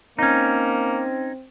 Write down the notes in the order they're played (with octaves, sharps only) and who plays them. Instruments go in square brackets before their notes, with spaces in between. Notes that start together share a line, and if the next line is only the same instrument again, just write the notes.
[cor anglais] A#3 [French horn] C4 [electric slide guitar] C#4 D#4